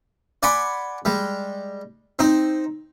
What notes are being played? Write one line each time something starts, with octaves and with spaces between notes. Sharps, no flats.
D5 F#5 G#5 B5 C6 D6
G3 G#3
C4 D#4